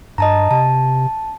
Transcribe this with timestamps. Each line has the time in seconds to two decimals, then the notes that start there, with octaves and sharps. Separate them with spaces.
0.18 G2 D#5 A5 A#5
0.51 C3 A5